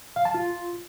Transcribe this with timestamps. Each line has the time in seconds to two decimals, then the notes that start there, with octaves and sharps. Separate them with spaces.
0.16 F5
0.25 A5
0.34 F4